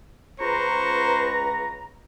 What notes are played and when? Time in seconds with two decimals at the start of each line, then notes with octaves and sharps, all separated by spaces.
0.40 C#2 B4 C5 A#5 C#6